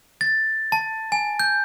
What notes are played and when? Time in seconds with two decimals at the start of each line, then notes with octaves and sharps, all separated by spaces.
0.21 A6
0.72 A5
1.12 G#5
1.40 G6